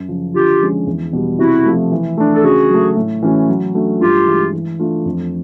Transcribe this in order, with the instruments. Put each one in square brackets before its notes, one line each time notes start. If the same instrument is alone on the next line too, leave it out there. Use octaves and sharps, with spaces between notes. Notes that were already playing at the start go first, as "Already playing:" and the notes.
Already playing: [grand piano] F#2
C#3 F3
[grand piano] D3 [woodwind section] F4 G4
[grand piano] F3 G#3 C#4
E2
B2 G3
[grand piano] C3 [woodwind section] E4 F#4
[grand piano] F3 A3
E3
A3 D4
[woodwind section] A4
[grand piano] C#3 [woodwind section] F#4 G#4
[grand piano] F#3 A3
A2
E3 A3 C#4 F#4
F#3
A3 D4 F#4
[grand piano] G2 [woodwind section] F4 G4
[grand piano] E3 G#3
E3
A3 D4 F4
F2